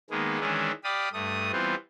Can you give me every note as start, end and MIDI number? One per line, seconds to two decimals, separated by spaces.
0.10 0.40 51
0.10 0.40 56
0.10 0.40 58
0.10 0.40 59
0.40 0.72 51
0.40 0.72 52
0.40 0.72 56
0.40 0.72 61
0.40 0.72 62
0.40 0.72 64
0.84 1.09 67
0.84 1.09 74
0.84 1.09 77
0.84 1.09 83
0.84 1.09 87
1.13 1.51 43
1.13 1.51 57
1.13 1.51 87
1.52 1.75 52
1.52 1.75 55
1.52 1.75 59
1.52 1.75 60
1.52 1.75 65